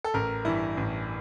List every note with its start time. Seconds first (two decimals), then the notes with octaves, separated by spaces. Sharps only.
0.04 A4
0.14 A1 A#4
0.45 G2 E3 E4
0.77 A1